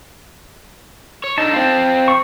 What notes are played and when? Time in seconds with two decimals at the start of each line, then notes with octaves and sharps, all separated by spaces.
1.24 C#5
1.38 D3 D#4 A5
1.53 C4 F4
2.08 C#6